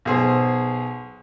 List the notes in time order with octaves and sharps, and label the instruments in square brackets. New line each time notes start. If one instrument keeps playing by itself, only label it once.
[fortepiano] B1 G#4 C5